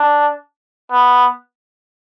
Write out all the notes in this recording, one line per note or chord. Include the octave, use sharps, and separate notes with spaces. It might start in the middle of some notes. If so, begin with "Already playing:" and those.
Already playing: D4
B3